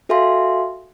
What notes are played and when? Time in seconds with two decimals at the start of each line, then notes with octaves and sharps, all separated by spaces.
0.09 F#4 A4 E5 F5 G#5 C6